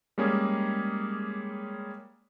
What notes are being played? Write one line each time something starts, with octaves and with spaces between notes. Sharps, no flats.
G3 G#3 A#3 C#4 G#4